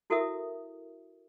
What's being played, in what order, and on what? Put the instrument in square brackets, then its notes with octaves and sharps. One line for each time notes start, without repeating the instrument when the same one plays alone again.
[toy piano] E4 F#4 A4 A#4 E5 D#6